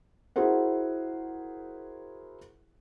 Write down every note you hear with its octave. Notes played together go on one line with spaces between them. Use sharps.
E4 F#4 G#4 A#4 C5 F#5